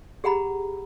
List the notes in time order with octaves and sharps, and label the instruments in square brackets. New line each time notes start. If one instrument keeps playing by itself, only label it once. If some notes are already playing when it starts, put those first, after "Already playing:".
[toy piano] G4 G#4 F#5 A#5 B5